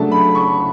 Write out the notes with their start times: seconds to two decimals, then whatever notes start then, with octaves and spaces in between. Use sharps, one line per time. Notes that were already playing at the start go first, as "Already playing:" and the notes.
Already playing: C#3 F#3 A3 D4 A5
0.12 B5
0.35 C#6